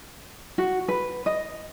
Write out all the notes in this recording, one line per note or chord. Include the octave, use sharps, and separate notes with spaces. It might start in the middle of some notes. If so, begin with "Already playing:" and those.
F#4
B4
D#5